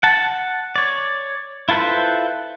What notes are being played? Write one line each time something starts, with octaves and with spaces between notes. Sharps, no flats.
F#5 A5
C#5 D5
E4 F4 A4 B4 C5